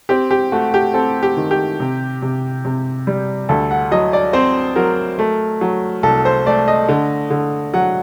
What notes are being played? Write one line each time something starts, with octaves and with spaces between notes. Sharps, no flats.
C4 G4
G4
A3 F#4
G4
C4 A4
G4
D#3
G4
C3
C3
C3
G3
D2 A4
F#5
F#3 D#5
D5
C4 C5
F#3 A#4
A3
F#3
C2 A4
C5
A3 D5
D#5
D3
D3
F#3 F#5